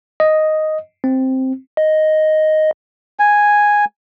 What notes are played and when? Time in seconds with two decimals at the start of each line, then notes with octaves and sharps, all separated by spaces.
0.20 D#5
1.04 C4
1.77 D#5
3.19 G#5